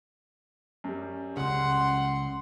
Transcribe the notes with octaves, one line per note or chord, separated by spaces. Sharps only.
F#2 G3
C#2 C#3 F#5 C6